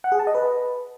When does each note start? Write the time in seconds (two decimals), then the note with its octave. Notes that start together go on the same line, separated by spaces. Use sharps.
0.04 F#5
0.12 G#4
0.19 A5
0.27 D#5
0.35 B4